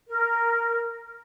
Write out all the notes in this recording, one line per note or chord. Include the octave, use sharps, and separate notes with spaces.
A#4